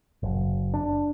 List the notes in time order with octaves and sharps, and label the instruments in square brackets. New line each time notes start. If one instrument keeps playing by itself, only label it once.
[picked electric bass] F#1
D4